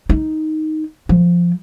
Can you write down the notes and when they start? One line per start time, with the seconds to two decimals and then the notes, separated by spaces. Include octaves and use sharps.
0.09 D#4
1.09 F3